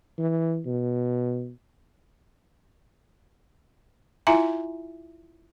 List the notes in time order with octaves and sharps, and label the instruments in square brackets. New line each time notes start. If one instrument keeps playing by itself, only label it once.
[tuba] E3
B2
[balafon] E4 F4 E5 G#5 A#5